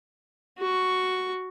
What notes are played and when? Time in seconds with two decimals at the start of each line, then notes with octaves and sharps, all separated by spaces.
0.59 F#4 C#6